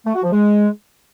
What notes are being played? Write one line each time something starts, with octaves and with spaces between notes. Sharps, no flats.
A3
F#4
F3
G#3